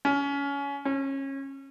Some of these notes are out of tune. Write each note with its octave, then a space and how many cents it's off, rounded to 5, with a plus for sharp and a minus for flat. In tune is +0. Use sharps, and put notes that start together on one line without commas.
C#4 +25
C#4 -25